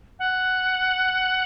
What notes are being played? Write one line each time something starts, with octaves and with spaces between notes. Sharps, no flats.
F#5